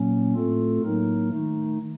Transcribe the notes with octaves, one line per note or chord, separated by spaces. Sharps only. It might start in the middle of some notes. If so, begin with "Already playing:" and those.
Already playing: A#2 F#3 A#3 C#4
A2 A3 C4 F4 A4
A2 F#3 A#3 D#4 A#4
D#3 A3 D#4